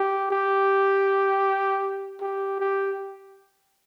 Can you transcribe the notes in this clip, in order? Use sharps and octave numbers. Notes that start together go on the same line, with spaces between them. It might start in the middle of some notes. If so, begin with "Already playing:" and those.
Already playing: G4
G4
G4
G4